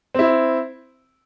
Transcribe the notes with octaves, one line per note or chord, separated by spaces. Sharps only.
C4 E4